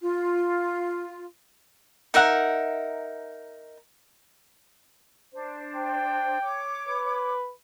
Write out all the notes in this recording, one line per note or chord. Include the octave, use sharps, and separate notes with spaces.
F4
D#4 A#4 E5 F#5
D4 C5
G5
C#5 D6
B4